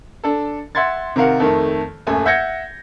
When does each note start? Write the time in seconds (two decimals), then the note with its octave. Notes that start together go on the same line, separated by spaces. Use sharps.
0.24 D4 A4
0.75 E5 F#5 C6 G#6 A6
1.16 C3 D#3 A#4 F5 F#5
1.40 F2 D#3 A3
2.07 D#1 F#2 A3 G#5
2.25 E5 F#5 G6 G#6 A#6 C#7